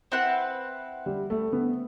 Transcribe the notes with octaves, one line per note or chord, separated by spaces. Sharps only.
C4 E4 B4 F#5
G3
A3
B3